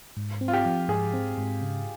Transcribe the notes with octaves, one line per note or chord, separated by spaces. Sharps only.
G#2
C4
F4
G4
F3
G#2 G#4
C4
G#2
C#3